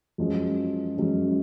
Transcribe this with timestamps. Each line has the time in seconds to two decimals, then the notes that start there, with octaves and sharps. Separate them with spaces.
0.18 F#2 F3 G#3 C#4
0.97 F#2 F3 G#3 C#4